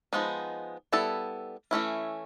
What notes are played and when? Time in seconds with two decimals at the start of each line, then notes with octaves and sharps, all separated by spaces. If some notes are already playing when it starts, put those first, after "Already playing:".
0.13 F3 G#3 B3 D#4
0.93 G3 B3 E4 A4
1.71 E3 A3 C#4 E4